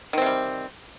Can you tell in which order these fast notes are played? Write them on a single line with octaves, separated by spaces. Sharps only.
D#3 C4 C3 G3